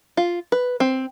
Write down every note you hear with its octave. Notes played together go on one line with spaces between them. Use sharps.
F4
B4
C4